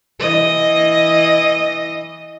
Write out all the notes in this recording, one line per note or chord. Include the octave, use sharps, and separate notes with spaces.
E3 D#5